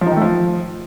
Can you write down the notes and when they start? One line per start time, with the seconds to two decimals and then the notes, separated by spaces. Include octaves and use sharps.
0.01 F3
0.06 D#4
0.11 D#3
0.16 A3
0.22 F3